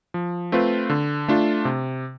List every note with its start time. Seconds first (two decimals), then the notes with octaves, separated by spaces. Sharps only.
0.14 F3
0.52 A3 C4 F4 B4
0.89 D3
1.28 A3 D4 F4
1.65 C3